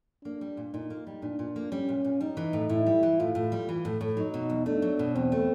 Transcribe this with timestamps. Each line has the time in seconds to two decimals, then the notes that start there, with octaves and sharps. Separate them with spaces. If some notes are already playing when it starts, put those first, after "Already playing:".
0.24 A#3 D4
0.41 G3
0.57 A#2
0.74 A#2 D#4
0.90 A#3
1.07 G3
1.22 A#2 D4
1.39 A#2
1.56 A#3
1.72 G3 C#4
1.89 A#2
2.04 A#2
2.21 G3 D#4
2.37 E3
2.53 A2
2.69 A2 E4
2.86 G3
3.03 E3
3.19 A2 F4
3.35 A2
3.52 G3
3.69 E3
3.85 A2
4.01 A2
4.17 F#3 D#4
4.34 B2
4.50 E2
4.66 A3 D4
4.82 F#3
4.99 B2
5.15 E2 C4
5.32 A3